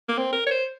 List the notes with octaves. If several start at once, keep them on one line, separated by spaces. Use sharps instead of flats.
A#3
C4
A#4
C#5
C5